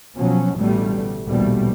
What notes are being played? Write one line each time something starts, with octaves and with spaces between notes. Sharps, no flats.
B2 F3 F#3 C#4
A1 B2 D3 G3 A3
A#1 D#2 B2 F3 G3 A3